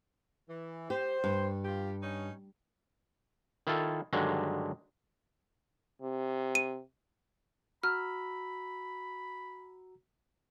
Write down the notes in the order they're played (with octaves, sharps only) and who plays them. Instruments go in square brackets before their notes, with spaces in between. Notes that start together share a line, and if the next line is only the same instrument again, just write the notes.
[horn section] E3
[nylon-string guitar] G4 [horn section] C5
[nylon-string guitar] G2
[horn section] F4 G4
C#4 D#4
[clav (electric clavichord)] D#3 E4 F4 A4
G2 D3 D#3 F#3 G#3
[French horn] C3
[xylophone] D#7
[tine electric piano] F#4 A#5 E6 [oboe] B5 [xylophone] F6